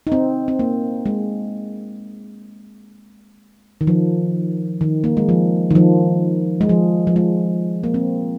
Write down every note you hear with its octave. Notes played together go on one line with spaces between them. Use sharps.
D#4
C4
C4
A#3
G#3
D#3
F3
D#3
A#3
G#3
F3
D#3
F3
G#3
F3
F3
G#3
A#3
C4